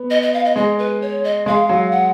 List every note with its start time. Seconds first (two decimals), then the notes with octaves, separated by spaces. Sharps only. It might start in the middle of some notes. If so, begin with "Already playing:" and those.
Already playing: B3
0.10 D#5
0.22 D#5
0.34 F5
0.45 D#5
0.56 G#3 D#5
0.78 B4
1.02 C#5
1.24 D#5
1.46 G#3 F5
1.69 F#3
1.92 F#5